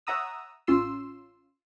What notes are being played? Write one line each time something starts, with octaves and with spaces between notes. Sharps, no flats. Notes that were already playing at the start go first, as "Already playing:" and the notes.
C#5 E5 F#5 A#5 D#6 E6
A1 C#4 F4 C6 E6